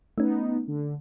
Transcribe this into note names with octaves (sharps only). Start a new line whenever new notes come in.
A3 B3 C#4 D#4
D3